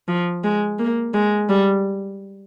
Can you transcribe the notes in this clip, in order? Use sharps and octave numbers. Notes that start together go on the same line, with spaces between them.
F3
G#3
A#3
G#3
G3